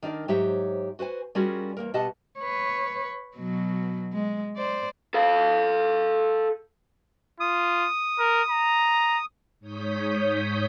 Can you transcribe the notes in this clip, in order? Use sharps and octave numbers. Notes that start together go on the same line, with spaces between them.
D#3 D4 A#4 D5
G#2 F#3 G4 C5 C#5 E5
F#4 B4 C5 G#5
G3 C#4 F4 F#4 G#4 A#4
E2 A#3 A#4
B2 G4 D#5 F#5 A5
B4 C#5
B2 F#3
G#3
C5 D5
A4 F5
F4 D#6
A#4
A#5
G#2 C#5 D#6 G6 B6